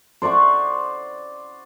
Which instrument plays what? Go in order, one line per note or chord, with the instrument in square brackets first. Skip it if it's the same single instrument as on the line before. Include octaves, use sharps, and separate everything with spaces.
[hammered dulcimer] C5 D5 F#5 C#6